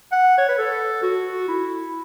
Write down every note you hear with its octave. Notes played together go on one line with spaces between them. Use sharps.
F#5
C#5
B4
A4
F#4
E4